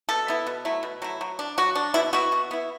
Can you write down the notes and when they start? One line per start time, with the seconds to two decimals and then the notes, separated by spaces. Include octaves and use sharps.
0.09 B2 A4
0.28 B3 E4
0.47 B2
0.65 F#3 A3 E4
0.83 B2
1.02 F#3 A3 E4
1.21 F#3
1.39 D4
1.58 F#3 F#4
1.75 D4
1.94 B2 E4
2.13 B3 E4 F#4
2.32 B2
2.51 B3 E4